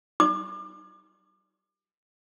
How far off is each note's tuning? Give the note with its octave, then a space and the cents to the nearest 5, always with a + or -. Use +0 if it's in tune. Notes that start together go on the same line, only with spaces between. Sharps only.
D6 +35